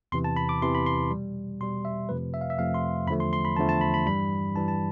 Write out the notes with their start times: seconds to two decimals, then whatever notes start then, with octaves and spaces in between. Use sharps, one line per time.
0.12 E2 C3 E3 C6
0.24 A5
0.37 B5
0.49 D6
0.62 E2 C3 E3 C6
0.75 B5
0.86 C6
1.10 B2 G3
1.60 B2 G3 C6
1.85 E5
2.09 F2 C3 F3 A3 B4
2.34 E5
2.41 F5
2.50 E5
2.58 F2 C3 F3 A3 F5
2.74 C6
3.07 E2 D3 F3 A3 B5
3.20 C6
3.33 C6
3.45 B5
3.56 E2 D3 F3 A3 A5
3.69 A5
3.81 B5
3.94 B5
4.06 G2 E3 G3 B5
4.55 G2 E3 G3 A5
4.68 A5